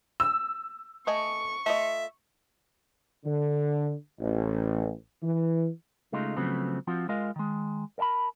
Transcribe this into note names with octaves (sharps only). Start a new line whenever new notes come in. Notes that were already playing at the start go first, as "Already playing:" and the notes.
E6
A3 D#5 G#5 C#6
A3 F4 D#5 E5
D3
A1
E3
C#3 G#3 A3 D#4 F4
C#3 F3 F#3 A3 B3 C4
F3 C4 F4 F#4
G#3 F4 A#4 D#5 F5
D#3 G#3
A#4 D5 E5 A5 B5